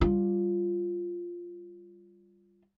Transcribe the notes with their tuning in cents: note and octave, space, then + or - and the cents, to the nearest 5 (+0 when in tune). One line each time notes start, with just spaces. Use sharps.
G3 +0 F4 +0